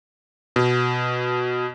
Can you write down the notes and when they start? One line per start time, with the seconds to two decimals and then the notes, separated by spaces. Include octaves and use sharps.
0.56 B2